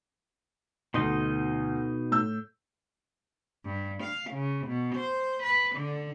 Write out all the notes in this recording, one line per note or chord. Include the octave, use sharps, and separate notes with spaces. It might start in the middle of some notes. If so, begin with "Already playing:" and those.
D2 B2 D#4 D#5 C6
A2 E6 G6
G2
F5
C#3
B2
C5
B4
D3